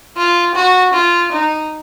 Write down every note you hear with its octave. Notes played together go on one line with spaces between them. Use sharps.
F4
F#4
F4
D#4